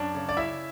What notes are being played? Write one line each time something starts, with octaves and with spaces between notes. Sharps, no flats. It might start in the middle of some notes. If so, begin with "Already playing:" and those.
Already playing: F#2 D4
C#3
D5
C#3 E4 E5